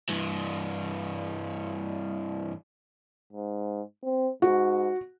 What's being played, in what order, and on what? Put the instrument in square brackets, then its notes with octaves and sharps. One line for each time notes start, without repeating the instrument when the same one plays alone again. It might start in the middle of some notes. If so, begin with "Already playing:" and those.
[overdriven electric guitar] G2 E3
[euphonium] G#2
C4
[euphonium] G#2 [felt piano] F#4